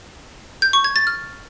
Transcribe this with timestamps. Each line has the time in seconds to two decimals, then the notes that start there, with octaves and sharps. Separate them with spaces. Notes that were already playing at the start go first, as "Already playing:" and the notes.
0.62 G6
0.73 C#6
0.84 G#6
0.96 A6
1.07 F6